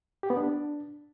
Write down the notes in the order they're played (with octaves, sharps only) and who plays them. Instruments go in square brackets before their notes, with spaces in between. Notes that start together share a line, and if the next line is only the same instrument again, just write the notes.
[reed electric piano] G4
B3
D4